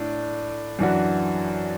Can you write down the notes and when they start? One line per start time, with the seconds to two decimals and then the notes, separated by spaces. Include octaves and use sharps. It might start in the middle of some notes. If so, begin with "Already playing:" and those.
Already playing: A2 D4
0.79 F#2 E3 D4 F#4